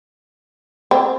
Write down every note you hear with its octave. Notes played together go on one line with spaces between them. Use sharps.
C4